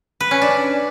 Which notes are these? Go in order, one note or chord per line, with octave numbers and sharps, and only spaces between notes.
B4
C#4
D4